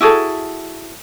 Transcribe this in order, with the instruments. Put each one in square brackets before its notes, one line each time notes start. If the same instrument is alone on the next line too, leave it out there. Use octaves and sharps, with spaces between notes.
[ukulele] E4 F#4 G#4 A4